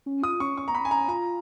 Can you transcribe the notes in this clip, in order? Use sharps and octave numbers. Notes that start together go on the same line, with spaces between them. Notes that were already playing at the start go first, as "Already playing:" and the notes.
C#4
F4 D#6
C#4 C#6
C#4 C#6
B3 A#5
B5
C#4 G#5
A#5
F4 A#5